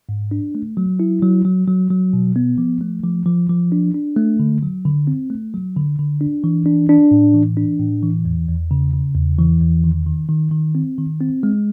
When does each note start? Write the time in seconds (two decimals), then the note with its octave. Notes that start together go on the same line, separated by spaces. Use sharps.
0.09 G#2
0.31 D4
0.55 A3
0.77 F#3
1.00 E4
1.22 F#3
1.45 F#3
1.67 F#3
1.90 F#3
2.13 B2
2.36 B3
2.58 F3
2.81 A3
3.04 F3
3.26 F3
3.50 F3
3.72 D4
3.94 D4
4.16 A3
4.40 D3
4.63 F#3
4.85 D3
5.07 C4
5.30 A3
5.54 F#3
5.76 D3
5.99 D3
6.21 D4
6.44 E3
6.66 D4
6.89 D4
7.11 A2
7.34 E3
7.57 D4
7.79 A2
8.03 E3
8.25 E2
8.48 E2
8.71 C#3
8.94 C#3
9.16 E2
9.39 E3
9.61 E2
9.84 D#3
10.06 D#3
10.29 D#3
10.51 D#3
10.75 C4
10.98 D#3
11.21 C4
11.43 G#3